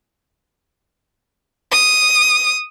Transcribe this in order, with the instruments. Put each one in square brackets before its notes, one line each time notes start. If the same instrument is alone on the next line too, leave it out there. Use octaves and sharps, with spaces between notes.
[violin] D#6